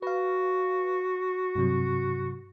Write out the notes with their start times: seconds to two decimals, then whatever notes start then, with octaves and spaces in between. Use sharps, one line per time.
0.02 F#4 B4 F5
1.55 G2 C3 F#3